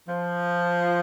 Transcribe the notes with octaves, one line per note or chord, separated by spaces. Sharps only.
F3